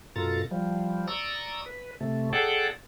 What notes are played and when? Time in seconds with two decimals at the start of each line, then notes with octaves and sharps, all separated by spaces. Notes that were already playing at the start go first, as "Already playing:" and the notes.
0.16 F#2 B2 F4 A4 A#5 A6
0.51 F3 G3
1.08 D5 A#5 C#6 D#6 E6
1.66 B4
2.01 C3 A3
2.33 G#4 A4 D5 F#5 G5 A5